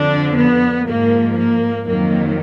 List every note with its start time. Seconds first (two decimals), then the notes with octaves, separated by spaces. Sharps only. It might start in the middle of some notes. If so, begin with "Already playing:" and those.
Already playing: F2 D3 F3 D4
0.35 B3
0.85 G#2 F3 A#3
1.35 A#3
1.86 F2 D#3 F#3 A#3